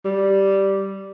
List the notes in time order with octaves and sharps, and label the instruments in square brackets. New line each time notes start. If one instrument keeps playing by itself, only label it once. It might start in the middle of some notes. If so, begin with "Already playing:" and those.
[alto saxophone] G3